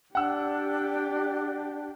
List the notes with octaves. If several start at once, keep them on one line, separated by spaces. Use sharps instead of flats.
D4 G4 F#5 E6